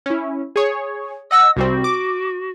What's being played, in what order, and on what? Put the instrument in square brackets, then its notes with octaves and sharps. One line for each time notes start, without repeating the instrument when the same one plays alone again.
[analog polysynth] C#4 E4
G#4 C#5
[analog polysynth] D#5 F#5 A#6 [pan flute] E6
[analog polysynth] C2 G3 C4 [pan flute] F#4
[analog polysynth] D6